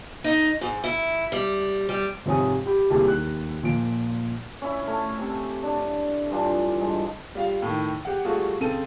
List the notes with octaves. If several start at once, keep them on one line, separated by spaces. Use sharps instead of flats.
D#4
G#2
E4
G3
G3
G#2 C3 F3 C#5 G#5 D#6
G4 B5
C2 A#3 G4 G#4 A5
D#2 F#6
A#2 F3 D7
C#4 E4
A3
C3 A5
D4
G2 E3 D4 F4
G2 G#3
G3 F4 F5
A2 D#3
G4 F#5
G3 A3 F4 F#4 G#4
C#3 C4 A4 D#7